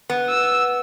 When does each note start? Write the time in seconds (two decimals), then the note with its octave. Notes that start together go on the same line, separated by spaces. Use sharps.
0.10 B3
0.29 E6